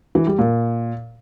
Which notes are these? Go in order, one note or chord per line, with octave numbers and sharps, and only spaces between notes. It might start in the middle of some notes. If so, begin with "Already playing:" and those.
E3
G3
A#2